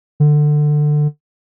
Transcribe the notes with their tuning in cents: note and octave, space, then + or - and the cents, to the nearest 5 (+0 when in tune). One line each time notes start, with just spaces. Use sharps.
D3 +20